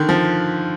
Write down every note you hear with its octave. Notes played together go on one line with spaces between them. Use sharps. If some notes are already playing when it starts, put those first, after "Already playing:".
Already playing: D3 D#3
F3